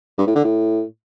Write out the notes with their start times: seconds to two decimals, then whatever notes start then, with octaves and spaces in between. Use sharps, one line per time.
0.18 G2
0.27 A2
0.35 D3
0.44 A2